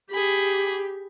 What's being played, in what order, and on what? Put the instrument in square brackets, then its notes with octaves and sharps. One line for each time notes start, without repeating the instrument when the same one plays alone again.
[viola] G4 [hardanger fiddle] G#4 B5